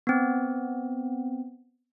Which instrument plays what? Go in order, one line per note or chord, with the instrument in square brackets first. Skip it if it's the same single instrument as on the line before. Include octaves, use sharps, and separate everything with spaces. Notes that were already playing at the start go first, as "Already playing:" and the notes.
[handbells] B3 C4